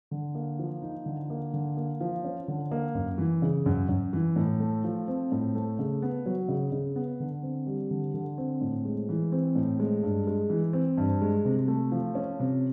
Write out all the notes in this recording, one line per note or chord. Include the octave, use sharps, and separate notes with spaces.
D3
A#3
F3
D#4
D3
A#3
D3
A#3
F3
C#4
D3
A#3
F#2
E3
C#3
F#2
F#2
E3
A2
A3
F3
C4
A2
A3
C#3
B3
F#3
C#3
C#3
B3
D3
C4
G3
D3
D3
C4
A2
G#3
E3
C4
A2
G#3
G2
G#3
E3
C4
G2
G#3
C3
A3
F3
C#4
C3